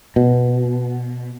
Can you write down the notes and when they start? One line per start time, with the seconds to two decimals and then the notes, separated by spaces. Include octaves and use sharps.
0.16 B2